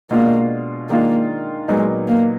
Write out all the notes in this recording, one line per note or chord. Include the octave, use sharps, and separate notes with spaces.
B2 G#3 A#3 D4 F4
D#3 G#3 A#3 D4 F4
A#2 F#3 G#3 B3 D#4
A#3